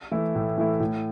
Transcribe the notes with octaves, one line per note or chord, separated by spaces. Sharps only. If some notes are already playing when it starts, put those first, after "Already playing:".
E3 A3 E4
A2
E3 A3 E4
A2